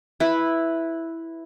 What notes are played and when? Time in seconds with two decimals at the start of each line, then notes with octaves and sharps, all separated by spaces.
0.20 E4 B4